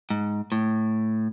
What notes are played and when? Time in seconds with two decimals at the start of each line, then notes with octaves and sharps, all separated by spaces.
0.10 G#2
0.52 A2